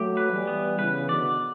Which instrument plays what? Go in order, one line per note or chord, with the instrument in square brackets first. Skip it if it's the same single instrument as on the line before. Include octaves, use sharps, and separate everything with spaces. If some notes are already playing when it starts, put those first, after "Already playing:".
Already playing: [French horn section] F#3 A3 [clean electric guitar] G4
[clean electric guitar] B4
[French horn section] E3 G3
[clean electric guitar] B3
[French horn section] C#3 E3 [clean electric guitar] B4
[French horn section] B2 D3 [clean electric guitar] D5